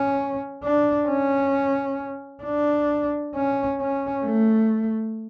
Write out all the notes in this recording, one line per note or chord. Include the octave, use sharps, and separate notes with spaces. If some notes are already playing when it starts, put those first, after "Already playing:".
Already playing: C#4
D4
C#4
D4
C#4
C#4
A3